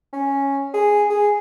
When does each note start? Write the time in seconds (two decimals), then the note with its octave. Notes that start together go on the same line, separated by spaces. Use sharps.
0.13 C#4
0.74 G#4
1.10 G#4